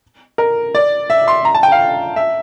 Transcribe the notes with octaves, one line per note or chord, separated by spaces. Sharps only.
A#4
D5
E5
C6
A#5
A5
G5
F5
E5